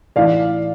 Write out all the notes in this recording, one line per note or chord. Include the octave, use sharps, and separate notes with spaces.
A2 E3 D5 F5